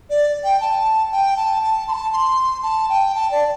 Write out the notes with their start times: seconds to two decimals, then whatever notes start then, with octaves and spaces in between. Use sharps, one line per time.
0.10 D5
0.44 G5
0.61 A5
1.12 G5
1.37 A5
1.63 A5
1.88 C6
1.93 A5
2.13 C6
2.63 A5
2.89 G5
3.15 A5
3.31 D5